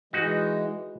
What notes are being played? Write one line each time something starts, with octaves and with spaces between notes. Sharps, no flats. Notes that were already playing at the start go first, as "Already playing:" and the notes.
E3 G#3 D#4 F#4